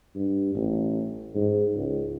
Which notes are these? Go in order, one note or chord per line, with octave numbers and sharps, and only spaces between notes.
G2
A1
G#2
C#2